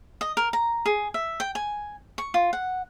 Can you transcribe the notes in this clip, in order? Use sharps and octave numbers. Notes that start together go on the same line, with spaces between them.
D#5
A#4
A#5
G#4
E5
G5
G#5
C#6
F4
F#5